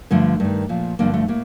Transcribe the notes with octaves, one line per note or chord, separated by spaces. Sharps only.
G2 D3 F3 A3
G2 D#3
A#2 F3
G2 D3 F3 A#3
A3
A2 A#3